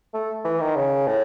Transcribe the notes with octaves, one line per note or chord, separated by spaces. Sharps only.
A3
E3
D#3
C#3
A2